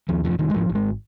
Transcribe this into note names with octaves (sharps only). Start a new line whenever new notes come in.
D#2 F3
F1 F3
F1 D#3
G#3
G#1 F3
G#1
G#3